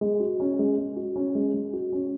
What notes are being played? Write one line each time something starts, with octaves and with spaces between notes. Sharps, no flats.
G#3
F#4
C#4
G#3
G#3
F#4
C#4
G#3
G#3
F#4
C#4